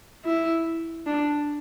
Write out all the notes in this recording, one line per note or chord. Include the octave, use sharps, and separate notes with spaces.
E4
D4